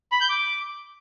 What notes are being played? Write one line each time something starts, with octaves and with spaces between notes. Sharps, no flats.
B5
G6
D6